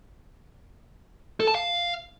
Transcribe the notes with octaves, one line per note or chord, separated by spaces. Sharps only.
A4
A5
F5